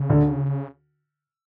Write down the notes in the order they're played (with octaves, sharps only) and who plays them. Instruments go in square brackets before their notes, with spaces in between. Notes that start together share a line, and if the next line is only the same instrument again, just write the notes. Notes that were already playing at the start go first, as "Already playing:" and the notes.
Already playing: [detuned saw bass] C#3
[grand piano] D2 D3